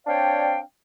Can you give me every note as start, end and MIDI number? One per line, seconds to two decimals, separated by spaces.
0.07 0.59 60
0.07 0.59 62
0.07 0.59 73
0.07 0.59 74
0.07 0.59 77
0.07 0.59 79